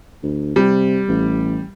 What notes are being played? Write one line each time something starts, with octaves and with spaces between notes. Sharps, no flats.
D2
C3 G3
A1